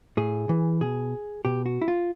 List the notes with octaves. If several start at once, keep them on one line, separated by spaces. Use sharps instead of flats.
A2 G#4
E3
B2 G#4
B2 G4
F#4
E4
F4